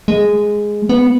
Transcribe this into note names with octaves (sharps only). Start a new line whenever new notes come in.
G#3
B3